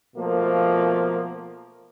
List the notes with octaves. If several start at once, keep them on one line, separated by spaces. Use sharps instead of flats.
B2 F3 A3 A#3